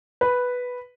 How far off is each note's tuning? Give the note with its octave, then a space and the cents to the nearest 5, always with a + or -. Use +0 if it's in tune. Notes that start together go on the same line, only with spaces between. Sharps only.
B4 +0